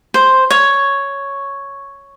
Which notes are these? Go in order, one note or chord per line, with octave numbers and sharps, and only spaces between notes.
C5
C#5